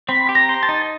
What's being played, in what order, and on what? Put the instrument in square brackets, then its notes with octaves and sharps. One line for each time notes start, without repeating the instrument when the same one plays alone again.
[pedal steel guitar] C4 [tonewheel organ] B5
[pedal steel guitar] G4
[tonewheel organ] A#5
[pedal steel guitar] C5
[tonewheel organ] A5
[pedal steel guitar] D#4